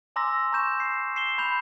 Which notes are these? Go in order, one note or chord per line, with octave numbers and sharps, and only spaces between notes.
G#5 A#5 C6 D6 E6 A#6
A#5 C#6 G6 E7
C7
C7 E7 G7
B5 G6 F7